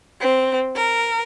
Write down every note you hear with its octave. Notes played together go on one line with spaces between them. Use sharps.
C4
A#4